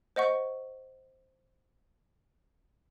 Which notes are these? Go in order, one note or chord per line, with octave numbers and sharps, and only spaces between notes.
C5 D#5 F#5 C#6